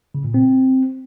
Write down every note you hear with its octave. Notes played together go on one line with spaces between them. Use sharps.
C#3
A#2
C4